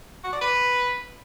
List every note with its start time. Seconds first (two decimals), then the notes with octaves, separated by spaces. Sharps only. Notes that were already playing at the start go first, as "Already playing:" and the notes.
0.24 F#4
0.33 D5
0.41 B4